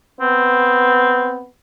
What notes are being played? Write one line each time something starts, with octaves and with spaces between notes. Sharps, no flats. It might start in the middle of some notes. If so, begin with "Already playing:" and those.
B3 C4